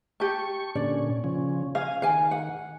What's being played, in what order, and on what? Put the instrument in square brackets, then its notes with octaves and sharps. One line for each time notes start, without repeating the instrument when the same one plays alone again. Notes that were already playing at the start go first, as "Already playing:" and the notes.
[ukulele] G4 A5 [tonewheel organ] C#6
[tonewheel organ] A#2 D3 C#4 [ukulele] D5
[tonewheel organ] C#3 F3 C#4
[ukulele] F5 [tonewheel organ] G#5
[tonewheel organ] D#3 [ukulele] F5 G#5
[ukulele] F#5